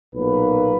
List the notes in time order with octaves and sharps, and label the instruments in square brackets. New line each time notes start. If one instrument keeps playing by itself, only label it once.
[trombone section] B1 A#2 F#3 A#3 B4